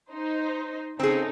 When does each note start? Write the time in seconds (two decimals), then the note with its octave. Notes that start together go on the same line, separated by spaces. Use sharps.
0.12 D#4 C5
0.99 C#3 C4 D#4 G#4 A4